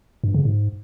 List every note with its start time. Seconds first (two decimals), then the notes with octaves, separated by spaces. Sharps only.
0.24 G2
0.34 C#3
0.45 G#2